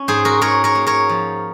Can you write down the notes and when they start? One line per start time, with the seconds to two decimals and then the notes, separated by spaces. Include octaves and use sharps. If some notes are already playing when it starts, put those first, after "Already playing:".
Already playing: C#4
0.08 G#2 G#4 C5
0.25 F#4 A#4
0.41 G#2 A#4 C#5
0.64 A#4 C#5
0.75 A#3
0.87 A#4 C#5
1.09 F3